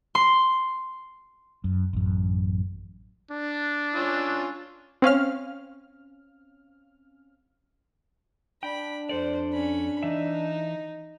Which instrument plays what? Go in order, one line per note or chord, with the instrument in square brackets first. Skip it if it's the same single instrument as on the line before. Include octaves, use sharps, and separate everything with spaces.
[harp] C6
[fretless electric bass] F#2
A1 F#2
[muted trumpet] D4
[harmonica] C#4 F4 E6
[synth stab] C4 C#4 F5 F6
[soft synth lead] D4 [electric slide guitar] G5 [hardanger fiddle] B5
[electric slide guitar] F2 A4 D5 [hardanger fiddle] C5
[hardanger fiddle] C#4 B5
[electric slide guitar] E3 E5 [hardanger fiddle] D#4